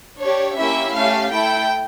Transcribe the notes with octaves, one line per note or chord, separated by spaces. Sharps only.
D4 G4 C#5
A#3 C#4 E4 G4 E5
A3 C#4 G4 F5
A3 E4 A4 G5